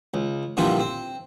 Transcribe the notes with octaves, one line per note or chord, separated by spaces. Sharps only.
C#2
A#2 D3 E3 F3 G3 F4
C4